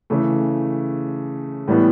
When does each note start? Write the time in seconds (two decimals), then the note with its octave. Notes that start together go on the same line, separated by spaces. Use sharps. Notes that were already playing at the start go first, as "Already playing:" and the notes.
0.10 C#3 E3 A3
1.68 A2 E3 G3 B3